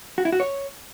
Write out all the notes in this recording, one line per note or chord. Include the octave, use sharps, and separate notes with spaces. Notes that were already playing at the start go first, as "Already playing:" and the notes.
F#4
E4
F#4
C#5